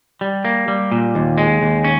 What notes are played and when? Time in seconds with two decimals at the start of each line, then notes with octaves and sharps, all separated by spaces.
0.21 G3
0.45 A#3
0.68 G3
0.92 A#2
1.15 D#2
1.38 G#3
1.62 D#2
1.84 C#4